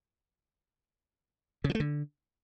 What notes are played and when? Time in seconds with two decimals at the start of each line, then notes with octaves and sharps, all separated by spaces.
1.64 C#3
1.70 F3
1.75 A3
1.80 D3